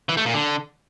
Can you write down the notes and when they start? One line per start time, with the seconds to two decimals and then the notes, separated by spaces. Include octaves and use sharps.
0.09 E3
0.17 A3
0.26 A#2
0.34 D3